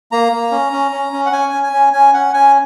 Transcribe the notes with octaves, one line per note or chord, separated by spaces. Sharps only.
A#3 A#5
A#3
C#4
C#4
C#4
C#4
F#5
C#4 G#5
C#4
G#5
C#4
C#4 G#5
C#4 F#5
C#4 G#5